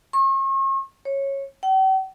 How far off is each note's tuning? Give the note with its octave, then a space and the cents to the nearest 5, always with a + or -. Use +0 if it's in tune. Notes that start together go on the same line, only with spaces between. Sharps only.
C#6 -40
C#5 -15
G5 -45